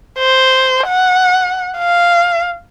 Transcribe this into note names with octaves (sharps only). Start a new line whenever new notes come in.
C5
F#5
F5